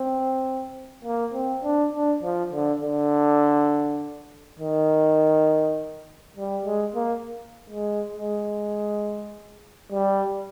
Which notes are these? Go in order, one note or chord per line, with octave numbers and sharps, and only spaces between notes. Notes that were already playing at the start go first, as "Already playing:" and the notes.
Already playing: C4
A#3
C4
D4
D4
F3
D3
D3
D#3
G3
G#3
A#3
G#3
G#3
G3